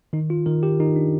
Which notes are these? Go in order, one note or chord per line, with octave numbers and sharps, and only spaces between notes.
D#3 D#4
F4
D#3 A#4
G4
D#3 D#4
D4